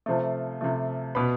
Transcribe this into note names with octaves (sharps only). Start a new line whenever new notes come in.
C3 F3 A3
C3 F3 A3
B2 B3 B5